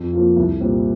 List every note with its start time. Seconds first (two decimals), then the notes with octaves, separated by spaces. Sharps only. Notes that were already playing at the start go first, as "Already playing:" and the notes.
Already playing: F2
0.13 F3 A#3 F4
0.36 C2
0.60 A#2 G3 C4